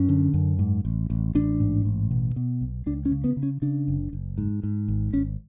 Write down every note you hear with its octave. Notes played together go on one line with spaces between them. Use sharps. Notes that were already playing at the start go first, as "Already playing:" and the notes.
Already playing: F#2 C#4
D3
F#2
G#2
A1
A1
A1 D4
G#2
A1
B2
B2
B1
C#2 D4
C#4
C#3
B3
C#3
C#4
C#3 D4
F#1
F#1
G#2
G#2
G#1
G#1 C#4